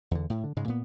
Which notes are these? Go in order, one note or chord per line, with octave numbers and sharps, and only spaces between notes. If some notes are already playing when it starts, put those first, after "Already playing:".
E2 D3
A2
D3
G#2 C#3 G#3
A#2 B3